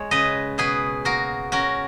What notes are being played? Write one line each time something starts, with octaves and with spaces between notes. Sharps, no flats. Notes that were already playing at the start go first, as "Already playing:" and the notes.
Already playing: G#3 C#5
C#3 B4 D#5
B2 G#4 B4
A#3 F#4 A#4
C#4 F#4 A#4